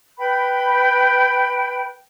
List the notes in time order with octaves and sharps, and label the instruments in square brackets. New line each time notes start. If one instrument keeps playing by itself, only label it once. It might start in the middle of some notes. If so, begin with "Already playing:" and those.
[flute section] B4 G5 B5